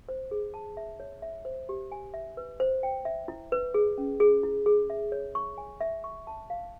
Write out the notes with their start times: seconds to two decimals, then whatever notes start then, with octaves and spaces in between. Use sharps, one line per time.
0.09 C5
0.31 G#4
0.54 A5
0.77 E5
1.00 C#5
1.22 E5
1.45 C5
1.69 G4
1.92 G#5
2.14 E5
2.37 B4
2.60 C5
2.83 G5
3.05 E5
3.28 E4
3.52 B4
3.74 G#4
3.98 C#4
4.20 G#4
4.43 E4
4.66 G#4
4.90 E5
5.12 C#5
5.35 C#6
5.58 G#5
5.81 E5
6.04 C#6
6.27 A5
6.50 F5